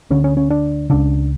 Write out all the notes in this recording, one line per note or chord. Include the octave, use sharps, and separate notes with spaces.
D2 D3 C#4
C#4
C#4
D4
C#2 C#3 D4